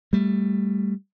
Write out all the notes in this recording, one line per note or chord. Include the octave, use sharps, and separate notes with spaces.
G3 A3